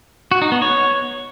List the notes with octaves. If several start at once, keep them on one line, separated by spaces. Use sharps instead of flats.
F#4
D#4
B3
C#5